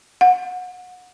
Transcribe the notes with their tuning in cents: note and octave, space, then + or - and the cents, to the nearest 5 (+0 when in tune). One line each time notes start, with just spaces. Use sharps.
F#5 -25